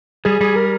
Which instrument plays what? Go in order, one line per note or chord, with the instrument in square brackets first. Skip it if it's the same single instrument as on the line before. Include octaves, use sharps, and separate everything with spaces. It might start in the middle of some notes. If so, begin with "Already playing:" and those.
[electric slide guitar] G3 [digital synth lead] G#4
[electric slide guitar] G3 [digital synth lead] G#4
[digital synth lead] A#4